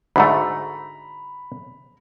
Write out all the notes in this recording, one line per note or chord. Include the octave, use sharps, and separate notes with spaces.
D2 G#2 A3 A#5 B5